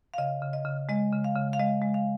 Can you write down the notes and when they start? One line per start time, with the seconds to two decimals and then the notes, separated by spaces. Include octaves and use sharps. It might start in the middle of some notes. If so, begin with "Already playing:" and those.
0.14 F5
0.18 C#3 D#5
0.42 C#3
0.53 D#5
0.65 C#3
0.89 G#3 D#5
1.13 C#3
1.24 F5
1.36 C#3
1.53 F5
1.59 G#3 D#5
1.82 G#3
1.94 F5